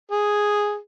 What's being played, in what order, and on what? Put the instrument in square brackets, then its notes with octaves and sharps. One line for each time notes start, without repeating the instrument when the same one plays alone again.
[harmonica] G#4